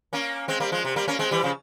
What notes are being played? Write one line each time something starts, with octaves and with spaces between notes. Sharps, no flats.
A#3 C#4
G#3 C4
G3 A#3
F3 G#3
C3
G3 A#3
A#3 C#4
G#3 C4
E3 G3
C#3 F3